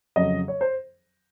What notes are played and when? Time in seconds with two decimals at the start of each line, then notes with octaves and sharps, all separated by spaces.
0.16 F2 C#3 F#3 D#5
0.48 C#5
0.61 C5